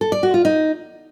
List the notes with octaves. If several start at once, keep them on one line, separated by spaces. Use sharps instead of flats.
A4
D5
F#4
F4
D#4